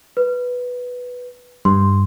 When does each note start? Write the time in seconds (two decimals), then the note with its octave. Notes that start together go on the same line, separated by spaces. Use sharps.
0.17 B4
1.65 G2 C6